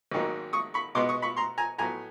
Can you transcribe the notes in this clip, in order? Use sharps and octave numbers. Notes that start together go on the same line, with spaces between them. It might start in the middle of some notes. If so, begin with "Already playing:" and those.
G#1 G#2 D#3 F#3 A#3
C#6 D#6
B5 C#6
B2 G#3 B3 D#4 C6 D6
C#6 D#6
B5 C#6
A#5 C6
G#5 A#5
A2 F#3 B3 G#5 A#5